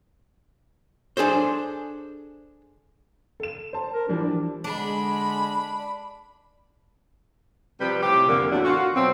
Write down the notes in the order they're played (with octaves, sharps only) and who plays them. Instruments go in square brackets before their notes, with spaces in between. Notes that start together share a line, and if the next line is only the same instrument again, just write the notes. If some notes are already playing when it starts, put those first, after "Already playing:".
[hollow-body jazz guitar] D4 G#4 A4 C5
[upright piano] A4 E7
C5 A5
[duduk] A#4
[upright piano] E3 F3 G3 [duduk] D4
[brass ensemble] D3 G#3 [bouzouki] D4 [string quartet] B5
[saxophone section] C3 F3 G3 G4 B4
A2 C3 G4
F2 D3 A#3
E2 A2 D3 D4 F#4
F4 F#4
B2 F#3 C4